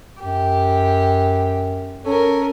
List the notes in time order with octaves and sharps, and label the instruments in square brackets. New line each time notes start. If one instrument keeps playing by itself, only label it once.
[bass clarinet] F#2 [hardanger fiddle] G4
[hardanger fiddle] C#4 A#4 [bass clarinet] A4